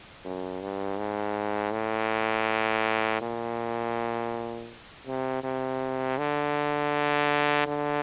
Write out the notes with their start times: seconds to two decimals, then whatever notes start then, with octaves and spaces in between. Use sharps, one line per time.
0.25 F#2
0.61 G2
0.98 G#2
1.72 A2
3.21 A#2
5.07 C3
5.43 C3
6.18 D3
7.67 D3